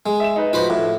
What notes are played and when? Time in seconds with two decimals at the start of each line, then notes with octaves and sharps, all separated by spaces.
0.06 G#3
0.20 E5 E7
0.36 D#4 B4
0.53 F3 F#4 B4 C5 B5
0.70 A2